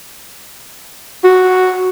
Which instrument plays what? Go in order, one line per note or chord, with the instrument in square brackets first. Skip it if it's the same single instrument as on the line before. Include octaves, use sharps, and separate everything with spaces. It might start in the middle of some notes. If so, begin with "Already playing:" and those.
[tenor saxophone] F#4